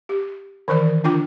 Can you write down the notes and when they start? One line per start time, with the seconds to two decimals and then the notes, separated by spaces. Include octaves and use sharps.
0.09 G4
0.68 D#3 E3 A#4 D5
1.04 D3 D4 F4 G5 D6